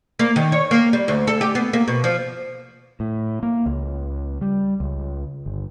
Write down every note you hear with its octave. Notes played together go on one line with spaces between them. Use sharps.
A#3
D#3
C#5
A#3
G3
D2
A4
G4
B3
A#3
B2
F3
A2
A#3
C#2
G3
C#2
G1